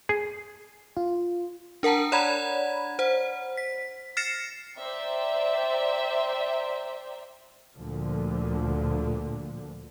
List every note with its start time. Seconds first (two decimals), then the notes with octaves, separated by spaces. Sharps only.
0.09 G#4
0.97 F4
1.83 D4 A#4 F#5 A5 A#5
2.12 C#5 D5 F#5 A#5 B5 G#6
2.99 C5 F#5
3.57 B6
4.17 F6 A6 A#6 C7 C#7 E7
4.78 C5 D5 E5 G5 A#5
7.76 D2 A#2 D3 F3